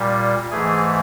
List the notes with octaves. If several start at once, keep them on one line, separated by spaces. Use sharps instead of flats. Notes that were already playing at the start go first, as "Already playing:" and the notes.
Already playing: A#2 G3
G#2 E3 A3 G#4